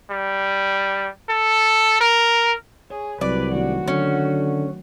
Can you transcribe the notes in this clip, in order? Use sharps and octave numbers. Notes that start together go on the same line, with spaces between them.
G3
A4
A#4
G#4 C#5
C2 F#3 C4 F#4 B4 D5
D#3 A3 D4 F#4
D3 F#3 C#4 D4